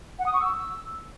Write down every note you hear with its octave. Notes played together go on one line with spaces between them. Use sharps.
F#5
D#6
C#6
E6